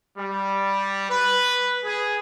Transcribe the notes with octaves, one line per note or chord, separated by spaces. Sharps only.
G3
B4
G#4